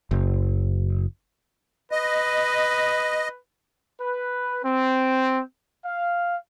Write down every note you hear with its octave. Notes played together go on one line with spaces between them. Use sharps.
F#1
B4 D#5
B4
C4
F5